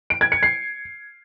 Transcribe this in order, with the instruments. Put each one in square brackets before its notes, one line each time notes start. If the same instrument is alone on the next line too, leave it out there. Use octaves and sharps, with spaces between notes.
[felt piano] D7
G#6
C#7
C7